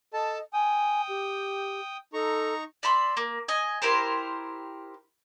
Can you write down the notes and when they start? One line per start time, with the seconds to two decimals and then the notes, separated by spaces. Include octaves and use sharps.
0.14 A4 D#5 A5
0.53 G5 G#5 D#6
1.09 G4
2.13 D#4 A4 A#5 C#6
2.83 D5 E5 B5 C6
3.17 A#3
3.48 D#5 G#5
3.82 E4 G4 A#4 C5